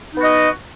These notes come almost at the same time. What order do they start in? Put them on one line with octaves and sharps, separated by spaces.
D#4 B3 F#4 D#5